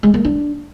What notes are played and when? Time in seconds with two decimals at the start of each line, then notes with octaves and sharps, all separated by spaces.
0.03 G#3
0.14 A#3
0.25 D4